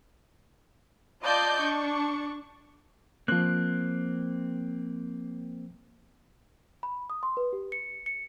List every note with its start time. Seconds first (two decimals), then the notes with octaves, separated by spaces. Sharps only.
1.22 F4 D5 D#5 A5 G6
1.60 D4 C#6
3.28 F3 A#3 C4 F#6
6.83 B5
7.10 D#6
7.23 C6
7.37 B4
7.53 G4
7.72 C#7
8.06 C#7